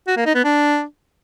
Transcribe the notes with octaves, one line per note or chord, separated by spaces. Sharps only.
F#4
A#3
D#4
B3
D4